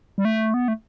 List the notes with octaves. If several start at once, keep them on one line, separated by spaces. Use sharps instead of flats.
G3
A3
B3
A3